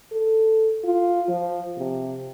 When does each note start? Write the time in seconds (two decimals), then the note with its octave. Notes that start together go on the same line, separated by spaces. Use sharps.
0.12 A4
0.84 F4
1.29 F3
1.77 C3